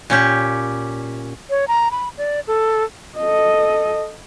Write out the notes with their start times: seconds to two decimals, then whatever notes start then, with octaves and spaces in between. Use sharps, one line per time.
0.10 A#2 C#4 G4
1.50 C#5
1.68 A#5
1.91 B5
2.17 D5
2.47 A4
3.18 A4 D#5